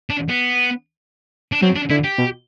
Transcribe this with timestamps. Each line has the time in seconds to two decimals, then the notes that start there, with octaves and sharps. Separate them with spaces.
0.10 D4
0.29 B3
1.52 D4
1.62 F#3 C4
1.76 D4
1.90 D3 E4
2.04 G4
2.18 B2